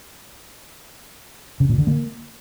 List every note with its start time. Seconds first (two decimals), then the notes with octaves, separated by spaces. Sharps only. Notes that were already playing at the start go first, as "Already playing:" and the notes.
1.60 C#3
1.69 A#2
1.78 D3
1.87 A#3